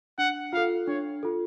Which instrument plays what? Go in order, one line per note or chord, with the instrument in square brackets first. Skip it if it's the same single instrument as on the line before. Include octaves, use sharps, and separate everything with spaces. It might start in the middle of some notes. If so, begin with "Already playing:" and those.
[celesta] D4 [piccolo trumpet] F#5
[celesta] F4 A4 [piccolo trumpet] F5
[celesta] D4 [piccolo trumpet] C#5
[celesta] F4 A4